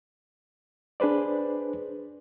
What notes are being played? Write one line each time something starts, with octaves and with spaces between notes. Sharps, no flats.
D4 G#4 B4 C5 D5